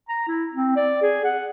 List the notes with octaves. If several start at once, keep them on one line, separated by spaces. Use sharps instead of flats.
A#5
E4
C4
D5
G#4
F#5